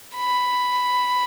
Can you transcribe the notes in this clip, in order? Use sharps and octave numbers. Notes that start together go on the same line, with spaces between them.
B5